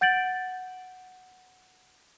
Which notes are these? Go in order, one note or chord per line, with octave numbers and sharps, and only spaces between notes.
F#5 G6 A6 D7 F#7